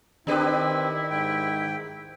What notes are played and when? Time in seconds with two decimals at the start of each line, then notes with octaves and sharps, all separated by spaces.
0.27 D#3 C4 D4 E4 G4 B4
1.10 G#2 G5